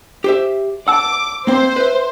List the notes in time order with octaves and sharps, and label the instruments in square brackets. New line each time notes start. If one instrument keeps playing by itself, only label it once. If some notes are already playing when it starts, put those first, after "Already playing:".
[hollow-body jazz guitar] G4 C5 E5
[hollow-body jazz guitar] F#5 A5 [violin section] D6 [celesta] E6
[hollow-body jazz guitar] A#3 C4 [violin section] C5
[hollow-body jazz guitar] B4 E5